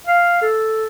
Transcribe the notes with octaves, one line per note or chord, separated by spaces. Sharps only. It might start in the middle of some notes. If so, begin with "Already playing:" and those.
F5
A4